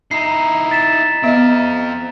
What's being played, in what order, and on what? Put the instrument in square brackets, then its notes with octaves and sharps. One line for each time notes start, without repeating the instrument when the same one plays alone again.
[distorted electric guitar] D#4 E4 [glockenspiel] A#5 C7
[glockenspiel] A6 B6 E7
[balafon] B3 D#5 [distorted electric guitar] C4 F5